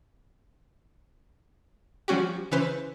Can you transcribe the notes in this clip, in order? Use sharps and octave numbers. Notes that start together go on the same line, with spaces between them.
F3 G3 C#4 F#4 G4
C#3 E3 C#4 B4 C5